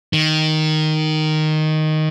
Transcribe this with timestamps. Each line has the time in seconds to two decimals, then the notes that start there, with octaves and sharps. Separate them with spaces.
0.13 D#3